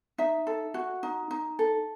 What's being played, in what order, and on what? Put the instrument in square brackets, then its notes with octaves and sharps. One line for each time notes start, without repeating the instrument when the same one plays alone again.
[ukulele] D#4 E5
A4
F#4
D#4
D#4
A4